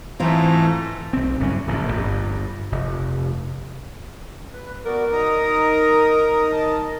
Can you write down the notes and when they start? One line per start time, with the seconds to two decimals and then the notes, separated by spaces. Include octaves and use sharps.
0.20 G#2 E3 A3 C4 F4 A#5
1.13 B1 C4
1.40 F#1 G2 F#3 C#4
1.67 D1 A#1 A#2
1.92 G1 G2
2.72 F1
4.52 B4
4.85 B3 F#4 A#4 D5
5.12 D#4 A#5 D#6
6.52 D#3 D#5 A5